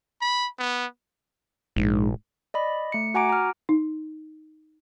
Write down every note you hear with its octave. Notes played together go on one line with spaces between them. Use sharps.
B5
B3
A#1 G#2
D5 D#5 B5
A3 C#7
F#4 F#5 G#5 A#5 D6 D7
A#5 F6
D#4